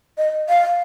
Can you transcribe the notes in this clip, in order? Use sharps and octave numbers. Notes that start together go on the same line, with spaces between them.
D#5
F5